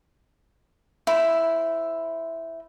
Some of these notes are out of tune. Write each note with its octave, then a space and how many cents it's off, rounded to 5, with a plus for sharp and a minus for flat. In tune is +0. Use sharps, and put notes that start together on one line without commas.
E4 +0 C5 -15